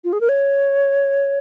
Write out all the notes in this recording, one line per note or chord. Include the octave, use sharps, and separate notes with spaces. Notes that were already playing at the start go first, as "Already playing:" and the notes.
F4
G#4
A#4
C#5